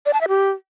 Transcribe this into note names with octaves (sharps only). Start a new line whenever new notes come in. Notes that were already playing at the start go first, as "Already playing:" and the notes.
D5
A5
E5
G4